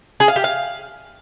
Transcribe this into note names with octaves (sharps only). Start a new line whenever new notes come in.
G#4
F5
G4
F5